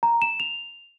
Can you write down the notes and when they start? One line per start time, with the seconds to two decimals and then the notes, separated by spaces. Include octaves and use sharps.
0.03 A#5
0.22 E7
0.40 F7